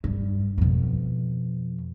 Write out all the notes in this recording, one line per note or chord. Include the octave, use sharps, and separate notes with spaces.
G2
F2 B2